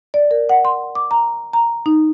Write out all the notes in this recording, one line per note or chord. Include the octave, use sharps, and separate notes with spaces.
D5
A#4
F#5
C6
D6
A#5
A#5
D#4